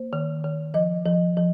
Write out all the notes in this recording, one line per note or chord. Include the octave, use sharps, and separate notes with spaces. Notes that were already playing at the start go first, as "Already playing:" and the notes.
Already playing: A#3 C5
D#3
D#3
F3 D#5
F3
F3